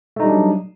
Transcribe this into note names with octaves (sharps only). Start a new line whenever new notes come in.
F#3 G3 A3 D4 D#4